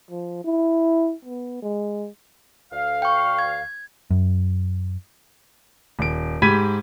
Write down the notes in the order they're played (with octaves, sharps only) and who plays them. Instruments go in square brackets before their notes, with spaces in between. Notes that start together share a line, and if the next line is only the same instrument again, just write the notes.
[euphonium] F3
E4
B3
G#3
[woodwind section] D2 F5
[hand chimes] G5 C#6
G#6
[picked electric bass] F#2
[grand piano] D#1 D7
G#2 G4 B5 G#6 B6 D#7